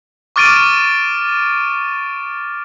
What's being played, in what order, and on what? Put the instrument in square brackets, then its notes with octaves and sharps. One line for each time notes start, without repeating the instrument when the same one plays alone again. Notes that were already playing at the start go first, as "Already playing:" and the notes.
[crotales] C#6 D6 F6 A6 D7 D#7